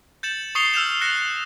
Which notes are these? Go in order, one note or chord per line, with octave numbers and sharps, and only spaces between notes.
G6 A6 C#7 E7 F#7
C#6 D#6 C7 C#7 F7 G7
E6 F6 G6 E7
F#6 A#6 C#7 E7